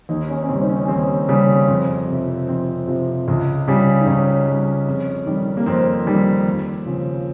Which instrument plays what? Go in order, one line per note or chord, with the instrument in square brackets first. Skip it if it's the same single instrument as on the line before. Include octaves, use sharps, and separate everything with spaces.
[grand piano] D#2 D#4
C#4
C#4
C#3 G3 C4
D#4
C#4
C#4
D#2 C4
C#3 G3
F2
C3
F3
F2 C4
C3 F3
C#2
C#3 G3
D#4
C#2 C#4
C#3 G3
F2
D#3 G3
A#3
F2 C4
D#3 G3
D#2
C#3 F3